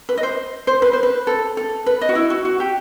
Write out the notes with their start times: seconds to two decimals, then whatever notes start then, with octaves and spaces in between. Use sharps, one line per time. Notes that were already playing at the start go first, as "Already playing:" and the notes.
0.09 B4
0.17 D#5
0.23 C5
0.67 C5
0.82 B4
0.93 C5
1.03 B4
1.27 A4
1.57 A4
1.86 B4
2.01 D#5
2.09 F#4
2.15 E4
2.30 F#4
2.45 F#4
2.60 G4